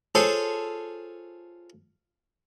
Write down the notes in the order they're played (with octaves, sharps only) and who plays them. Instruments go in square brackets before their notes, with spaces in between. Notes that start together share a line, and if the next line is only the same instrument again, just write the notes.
[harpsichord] F4 G#4 A4 C5 C#5